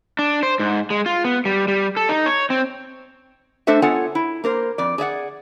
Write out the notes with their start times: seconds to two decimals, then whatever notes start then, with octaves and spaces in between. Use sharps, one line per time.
0.19 D4
0.43 C5
0.59 G#2
0.90 G#3
1.06 F4
1.24 B3
1.45 G3
1.68 G3
1.97 A4
2.09 D#4
2.26 C#5
2.50 C4
3.67 A3 D4 A4 C5 E5
3.82 B3 F4 A4 C#5 F#5 G#5
4.15 E4
4.44 A#3 A#4 C5
4.78 F2 D5
4.98 G#4 D5 E5 F#5